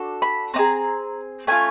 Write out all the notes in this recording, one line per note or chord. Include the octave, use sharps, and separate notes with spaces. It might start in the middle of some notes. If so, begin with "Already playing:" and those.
Already playing: D4 F#4 A4
B5
C4 D#4 A#5
G#4
A3 C#4 F4 G#5